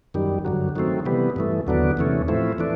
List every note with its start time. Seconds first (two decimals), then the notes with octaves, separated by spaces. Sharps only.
0.14 F#2 D#3 G3
0.45 G2 D3 F#3
0.76 D#3 F#3 A3 C4
1.05 C3 E3 G3 B3
1.36 G2 E3 A3
1.67 D#2 D3 F#3 B3 D4
1.97 E2 C3 E3 A3 C#4
2.28 A2 F3 A3 C4 E4
2.58 E3 A3 D4